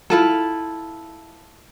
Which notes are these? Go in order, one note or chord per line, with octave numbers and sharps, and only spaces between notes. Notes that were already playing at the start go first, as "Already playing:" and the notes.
E4 F4 A4